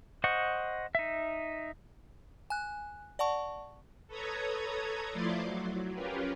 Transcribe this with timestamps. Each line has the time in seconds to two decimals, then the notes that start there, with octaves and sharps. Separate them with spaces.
0.24 C5 D#5 F#5 C#6
0.95 D#4 E5
2.50 G#5 F#6
3.19 D5 F#5 A5 C#6
4.08 A4 B4 C#5 A#5 D#6 G#6
5.11 F3 A3 E4 D5 C6 D6
5.43 F#3
5.93 C#4 F4 G4 A#4 B4